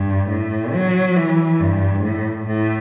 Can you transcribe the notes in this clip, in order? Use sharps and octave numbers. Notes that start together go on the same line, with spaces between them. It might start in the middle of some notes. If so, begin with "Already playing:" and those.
Already playing: G2
A2
F#3
E3
G2
A2
A2